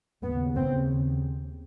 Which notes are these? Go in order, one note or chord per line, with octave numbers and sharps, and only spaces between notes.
D#2 C#3 B3
C4